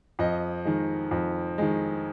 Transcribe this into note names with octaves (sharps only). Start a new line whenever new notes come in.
F2 D#5
D#3 G#3
F2
D#3 G#3